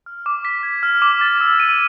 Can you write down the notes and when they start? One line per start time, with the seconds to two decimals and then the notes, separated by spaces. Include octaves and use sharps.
0.06 F6
0.26 D6
0.45 B6
0.63 G#6
0.83 F6
1.02 D6
1.21 A6
1.41 E6
1.60 D#7